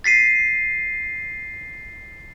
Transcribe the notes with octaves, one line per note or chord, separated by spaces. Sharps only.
A6 B6 C7 D#7